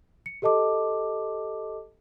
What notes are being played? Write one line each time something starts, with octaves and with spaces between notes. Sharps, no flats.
C#7
G4 A4 D#5 A5 D6